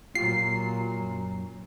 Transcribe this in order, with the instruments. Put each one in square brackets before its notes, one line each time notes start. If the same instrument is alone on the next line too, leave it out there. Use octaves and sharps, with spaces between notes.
[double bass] A#2 F#3 [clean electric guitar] F4 G4 [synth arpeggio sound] C7
[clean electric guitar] F#2